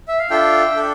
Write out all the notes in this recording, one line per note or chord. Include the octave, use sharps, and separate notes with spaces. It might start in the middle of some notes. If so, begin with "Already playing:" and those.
E5
F5
D4 F4 A4 E5 G5
D4 A4